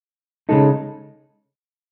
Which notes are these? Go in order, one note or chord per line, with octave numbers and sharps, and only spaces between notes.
C#3 G#3 D#4 A4